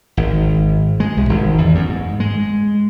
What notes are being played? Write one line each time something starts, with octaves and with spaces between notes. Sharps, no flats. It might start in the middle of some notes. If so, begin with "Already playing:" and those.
G#1
G#3
C2
G#1
E2
F#2
G#2
G#3